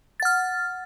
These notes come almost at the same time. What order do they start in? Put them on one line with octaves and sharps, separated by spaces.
A6 F#5 F6